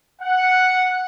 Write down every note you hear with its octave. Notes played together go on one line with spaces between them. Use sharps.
F#5